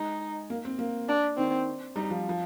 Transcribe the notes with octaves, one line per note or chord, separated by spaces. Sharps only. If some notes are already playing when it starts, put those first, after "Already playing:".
Already playing: G#3 D#4
A#3
C4
A#3
D4
D#3 C4
G3 D#4
F3
F3